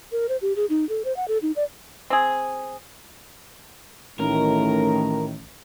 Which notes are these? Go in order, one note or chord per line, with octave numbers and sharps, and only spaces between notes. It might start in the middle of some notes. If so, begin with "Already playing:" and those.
A#4
C5
G4
G#4
D#4
A4
C5
F#5
A4
D#4
D5
C4 G#4
A1 A2 D#3 A#4